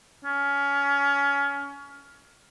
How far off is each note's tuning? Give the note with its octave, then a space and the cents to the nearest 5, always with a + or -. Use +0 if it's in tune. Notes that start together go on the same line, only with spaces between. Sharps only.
C#4 +25